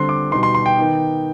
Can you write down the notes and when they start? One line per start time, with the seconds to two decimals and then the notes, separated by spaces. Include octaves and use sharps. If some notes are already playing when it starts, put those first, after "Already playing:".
Already playing: D3 G3 C4 C6
0.09 D6
0.31 B2 G3 B3 D#4 C6
0.43 C6
0.55 C6
0.66 G5
0.77 D#3 B3 D#4